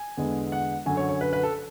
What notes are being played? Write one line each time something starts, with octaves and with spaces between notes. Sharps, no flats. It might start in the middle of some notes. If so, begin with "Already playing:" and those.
Already playing: G#5
E2 D3 G#3 B3
F#5
F#2 D3 F#3 G#5
C#5
C#5
B4
B4
A4